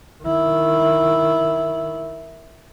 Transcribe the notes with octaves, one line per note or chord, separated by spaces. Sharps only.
D#3 E4